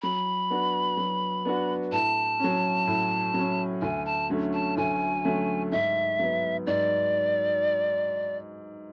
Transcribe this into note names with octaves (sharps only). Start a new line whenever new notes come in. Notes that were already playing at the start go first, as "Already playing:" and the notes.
F#3 B5
B3 D4 F#4
F#3
B3 D4 F#4
A2 A5
F#3 C#4
A2
F#3 C#4
D2 G#5
A5
D3 F#3 A3 C#4
A5
D2 G#5
D3 F#3 A3 C#4
G#2 E5
F#3 B3
G#2 D5